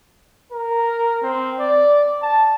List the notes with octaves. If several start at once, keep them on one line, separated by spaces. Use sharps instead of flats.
A#4
C4
D5
A5